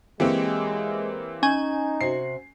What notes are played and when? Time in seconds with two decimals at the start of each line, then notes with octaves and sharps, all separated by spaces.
0.20 E3 G#3 A#3 C4 G4 C#5
1.43 C#4 D#4 G#5
2.01 C3 F#4 C7